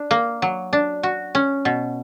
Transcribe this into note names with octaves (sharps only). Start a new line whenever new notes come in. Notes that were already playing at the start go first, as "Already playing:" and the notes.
Already playing: D4
A#3
F#3
D4
F#4
C#4
B2